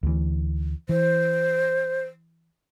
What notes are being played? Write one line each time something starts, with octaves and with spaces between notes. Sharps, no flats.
D2 E3
E3 C5